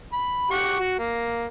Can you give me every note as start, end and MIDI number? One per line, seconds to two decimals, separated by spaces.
0.13 0.48 83
0.51 0.77 67
0.51 0.77 78
0.51 0.77 85
0.79 0.96 66
0.98 1.46 58